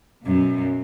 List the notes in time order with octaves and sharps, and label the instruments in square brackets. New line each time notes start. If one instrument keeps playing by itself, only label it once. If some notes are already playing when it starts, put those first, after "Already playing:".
[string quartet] F#2 B2